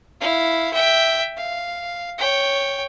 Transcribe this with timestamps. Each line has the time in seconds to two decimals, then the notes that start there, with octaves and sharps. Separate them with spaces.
0.21 E4 F5
0.73 E5 G5
1.37 F5
2.18 C#5 G5